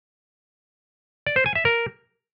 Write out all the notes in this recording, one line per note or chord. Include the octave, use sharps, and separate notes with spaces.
D5
C5
G#5
E5
A#4